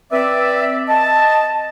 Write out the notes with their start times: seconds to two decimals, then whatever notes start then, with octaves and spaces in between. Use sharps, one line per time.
0.12 C4 B4 D5 E5
0.89 D#5 A5